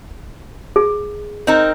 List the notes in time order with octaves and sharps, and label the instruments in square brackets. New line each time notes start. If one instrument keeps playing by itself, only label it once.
[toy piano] G#4
[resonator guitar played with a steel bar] C4 D#4 A#4